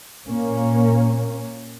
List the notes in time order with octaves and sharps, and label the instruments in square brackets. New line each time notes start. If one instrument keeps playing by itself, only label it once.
[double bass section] A#2 A#3 C#4